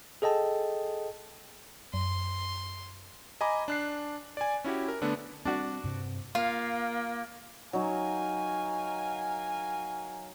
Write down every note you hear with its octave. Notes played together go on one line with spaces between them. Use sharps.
G#4 A4 D#5 G5 A5
F#2 C6
D#5 G#5 A#5 B5 D6
D4 F#6 C7
D5 G#5
C#4 E4 F#4 G4
A#4
D3 A3 B3 D4
G3 C4 D4 F#4
G2 C3
A#3 F4 F5
F#3 D#4 A#4 F5 G#5